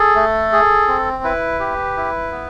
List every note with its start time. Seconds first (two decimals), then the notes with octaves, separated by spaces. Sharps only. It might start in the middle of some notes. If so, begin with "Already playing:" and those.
Already playing: G#4 A4
0.16 A3
0.52 G#4
0.88 C4
1.23 E4 B4
1.60 G4
1.97 E4
2.32 B3